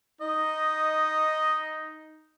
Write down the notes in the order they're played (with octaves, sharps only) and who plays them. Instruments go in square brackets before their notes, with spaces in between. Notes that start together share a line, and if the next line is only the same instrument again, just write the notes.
[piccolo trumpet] D#4 [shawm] D#5